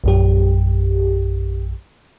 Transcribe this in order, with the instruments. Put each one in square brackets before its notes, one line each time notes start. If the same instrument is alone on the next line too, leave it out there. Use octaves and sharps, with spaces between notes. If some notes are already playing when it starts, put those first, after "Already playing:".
[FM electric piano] A#1 F#2 G4